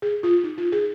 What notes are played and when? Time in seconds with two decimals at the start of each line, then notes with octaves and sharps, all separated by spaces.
0.02 G#4
0.23 F4
0.44 D#4
0.58 F4
0.72 G#4